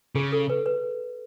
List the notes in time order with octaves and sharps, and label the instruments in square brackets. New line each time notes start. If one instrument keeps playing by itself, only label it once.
[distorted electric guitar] C#3 [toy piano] G#4
[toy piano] A4
B4
B4